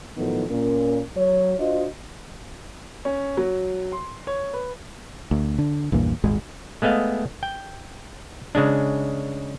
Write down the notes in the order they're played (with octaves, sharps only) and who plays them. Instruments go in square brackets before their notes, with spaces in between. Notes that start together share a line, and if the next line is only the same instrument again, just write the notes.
[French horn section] A2 D#3 F3 F#3 A3 B3
A#2 C#4 A#4
F#3 C#5
D4 F4 F#4 C5 D#5
[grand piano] C#4
F#3
C6
C#5
B4
[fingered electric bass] D2
D3
A#1 E2 G2 A#2
D#1 G#1 G#3
[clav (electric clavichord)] G#3 A3 B3 D#5 F5
G5
C#3 G#3 D4